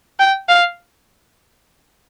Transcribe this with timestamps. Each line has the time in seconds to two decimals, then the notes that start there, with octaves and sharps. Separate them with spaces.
0.19 G5
0.49 F5